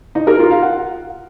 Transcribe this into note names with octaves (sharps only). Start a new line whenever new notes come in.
D#4
A#4
F4
F5
F#5